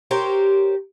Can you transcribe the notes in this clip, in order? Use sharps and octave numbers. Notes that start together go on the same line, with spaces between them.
G4 A#4 C5 C#5